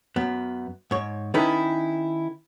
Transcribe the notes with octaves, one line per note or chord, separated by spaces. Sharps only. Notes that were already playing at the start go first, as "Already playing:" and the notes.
F#2 B3
G#2 C#5
D#3 C#4 D#4 E4 A4 B4